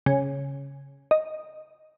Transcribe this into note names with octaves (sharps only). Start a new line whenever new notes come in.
C#3
D#5